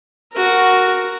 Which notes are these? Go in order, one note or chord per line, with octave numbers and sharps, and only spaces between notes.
F#4 A#4